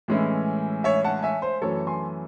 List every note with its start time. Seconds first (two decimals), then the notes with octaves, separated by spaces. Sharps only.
0.08 A2 E3 G#3 C#4 E4
0.84 C#5 E5
1.04 F#5 A5
1.23 E5 G#5
1.42 C5
1.62 F#2 E3 A3 A4 C#5
1.87 G#5 C6